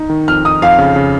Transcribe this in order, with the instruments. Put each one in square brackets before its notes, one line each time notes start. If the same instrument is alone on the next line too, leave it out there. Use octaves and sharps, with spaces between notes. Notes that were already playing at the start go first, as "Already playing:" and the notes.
Already playing: [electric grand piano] D#4
D#3
[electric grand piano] F2 [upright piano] F6
[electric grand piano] D#4 [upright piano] D#6
[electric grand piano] F2 [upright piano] F5
[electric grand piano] C#3
C#3